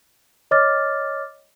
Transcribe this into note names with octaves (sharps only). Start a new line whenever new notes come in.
C#5 D#5 D6 F6 A6